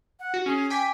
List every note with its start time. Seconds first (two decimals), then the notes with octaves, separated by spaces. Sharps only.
0.20 F#5
0.34 F#4
0.46 C#4 G#4
0.70 G5 G#5 D6 B6